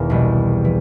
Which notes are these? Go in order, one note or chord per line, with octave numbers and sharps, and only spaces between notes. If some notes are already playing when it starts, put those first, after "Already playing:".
Already playing: E1 E2 D#3
C2 B2 G3
E3